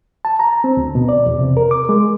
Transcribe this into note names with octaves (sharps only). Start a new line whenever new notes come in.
A5
A#5
C4
D2
B2
D5
E2
C3
A#4
D6
G#3